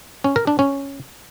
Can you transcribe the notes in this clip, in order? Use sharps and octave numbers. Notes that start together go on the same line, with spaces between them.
C#4
A#4
D4
C#4